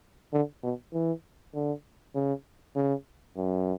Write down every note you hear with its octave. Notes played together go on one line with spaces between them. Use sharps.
D3
B2
E3
D3
C#3
C#3
F#2